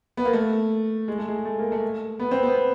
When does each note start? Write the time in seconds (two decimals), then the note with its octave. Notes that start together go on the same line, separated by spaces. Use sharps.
0.17 B3
0.25 A#3
0.33 A3
1.08 G#3
1.18 A3
1.28 G#3
1.45 A3
1.59 A#3
1.72 A3
2.20 B3
2.31 C4
2.43 B3